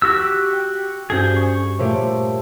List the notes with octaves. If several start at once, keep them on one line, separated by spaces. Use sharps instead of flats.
F#4 G4 E6
G5
G2 C#4 F#4 G#4 A4 C5
C#6
A#2 A3 G4 A#4 C5 C#5